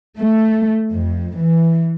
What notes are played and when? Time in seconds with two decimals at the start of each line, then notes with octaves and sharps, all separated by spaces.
0.17 A3
0.94 F2
1.38 E3